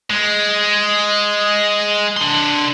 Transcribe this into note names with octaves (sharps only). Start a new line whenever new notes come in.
G#3
D4 C6